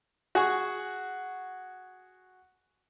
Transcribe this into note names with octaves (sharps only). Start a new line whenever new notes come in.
F#4 G#4 C#6